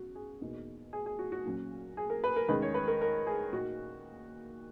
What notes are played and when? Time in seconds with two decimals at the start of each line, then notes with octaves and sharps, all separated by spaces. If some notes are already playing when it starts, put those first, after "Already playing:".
Already playing: C#3 B3 F#4
0.15 G#4
0.41 E2 B2 A#3 D#4
0.93 G#4
1.06 G#4
1.19 F#4
1.32 F#4
1.45 A#2 F#3 C#4
1.97 G#4
2.10 A#4
2.24 B4
2.36 A#4
2.49 E2 D#3 G#3 C#4 B4
2.62 C#5
2.74 B4
2.88 A#4
3.01 A#4
3.27 G#4
3.52 A#2 A#3 D#4 F#4